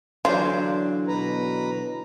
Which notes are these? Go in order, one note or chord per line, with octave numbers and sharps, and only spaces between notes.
D3 E3 F#3 D4 F4 C5
B2 B4 A#5